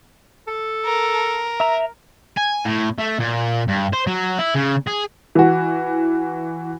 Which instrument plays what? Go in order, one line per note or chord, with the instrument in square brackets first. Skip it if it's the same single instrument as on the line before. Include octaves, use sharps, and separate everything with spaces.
[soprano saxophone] A4
[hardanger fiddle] A#4
[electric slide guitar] E5 A#5
[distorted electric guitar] G#5
A2
A3
A#2
G2
C5
F#3
E4
C#3
G#4
[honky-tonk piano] E3 F#4